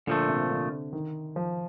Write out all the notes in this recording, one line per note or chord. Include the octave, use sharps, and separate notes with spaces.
A#2 D3 F3 A3
C3
D3
D#3
F3